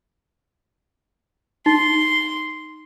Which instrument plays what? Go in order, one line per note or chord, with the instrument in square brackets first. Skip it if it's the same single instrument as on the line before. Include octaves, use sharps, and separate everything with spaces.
[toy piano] D#4 [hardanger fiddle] C6